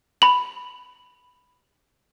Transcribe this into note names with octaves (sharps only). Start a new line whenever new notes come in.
B5 F#7